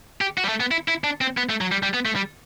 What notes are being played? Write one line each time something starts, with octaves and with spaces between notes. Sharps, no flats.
G4
F#4
G3
A3
B3
E4
E4
D4
C4
B3
A3
F#3
G3
G3
B3
A3
G3